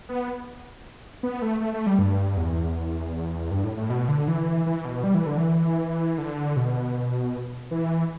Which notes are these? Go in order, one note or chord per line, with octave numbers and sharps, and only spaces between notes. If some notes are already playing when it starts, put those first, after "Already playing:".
B3
B3
A3
A3
A3
G3
G2
E2
G2
A2
A2
B2
D3
E3
E3
B2
G3
E3
D3
E3
D3
B2
E3